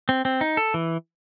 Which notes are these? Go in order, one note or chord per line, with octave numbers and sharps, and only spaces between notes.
C4
C4
D#4
A4
E3